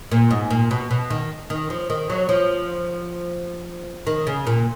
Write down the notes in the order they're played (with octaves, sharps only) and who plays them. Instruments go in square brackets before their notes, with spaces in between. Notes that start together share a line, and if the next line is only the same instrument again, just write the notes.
[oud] A#2
G#2
A#2
B2
B2
D#3
D#3
F3
D#3
F#3
F3
D#3
C#3
A#2